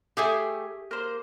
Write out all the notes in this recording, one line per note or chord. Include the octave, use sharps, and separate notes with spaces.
A3 G4 G#4 E5 G5 G#5
A#3 C5